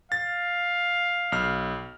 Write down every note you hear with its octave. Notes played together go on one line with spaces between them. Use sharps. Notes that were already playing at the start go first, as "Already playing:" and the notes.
F5 A6
B1 F6